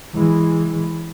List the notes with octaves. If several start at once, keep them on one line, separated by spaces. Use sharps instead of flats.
E3 G#3